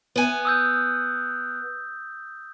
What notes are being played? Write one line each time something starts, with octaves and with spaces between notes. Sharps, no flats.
B3 G#5
D#6 E6 G6